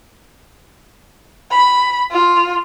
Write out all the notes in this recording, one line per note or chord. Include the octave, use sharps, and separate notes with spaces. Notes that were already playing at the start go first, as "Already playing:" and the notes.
B5
F4